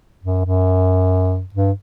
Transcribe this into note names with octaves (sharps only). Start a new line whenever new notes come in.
F#2
F#2
G2